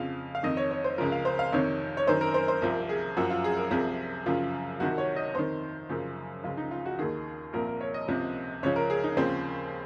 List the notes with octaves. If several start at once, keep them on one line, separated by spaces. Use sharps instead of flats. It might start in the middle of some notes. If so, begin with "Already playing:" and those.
Already playing: F2 C#3 F3 F5
F5
F2 D#3 D#5
C#5
C#5
C5
C#2 C#3 F3 A#4
F5
C5
F5
F2 C3 D#3 C#5
C#5
F#2 D#3 C5
A#4
C5
C5
C2 C3 F3 A#4
G#4
F#2 F3 F#4
F4
G#4
A#4
C2 C3 F3 G#4
F#2 C#3 F3 F4
C2 C3 D#3 F#4
C#5
D#5
F2 D#3 C5
F#2 C#3 F3
C#2 C#3 F3 F4
D#4
F4
F#4
D#2 D#3 G#4
C2 A#2 F3 A#4
A#4
C#5
D#5
C#2 C3 F3
C#2 C#3 F3 C#5
A#4
G#4
D#4
D#2 C#3 F3 C4